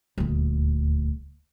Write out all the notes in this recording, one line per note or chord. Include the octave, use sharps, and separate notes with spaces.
D#1 D2